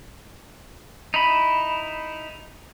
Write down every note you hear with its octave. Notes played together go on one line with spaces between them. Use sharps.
D#4 E4 B5